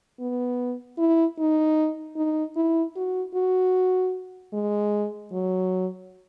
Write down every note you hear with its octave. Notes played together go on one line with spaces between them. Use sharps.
B3
E4
D#4
D#4
E4
F#4
F#4
G#3
F#3